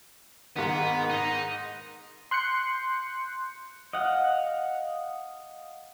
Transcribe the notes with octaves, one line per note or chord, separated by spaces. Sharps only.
G#2 D#3 B3
D#4
C6 F#6 G6 C#7
D#5 F5 F#5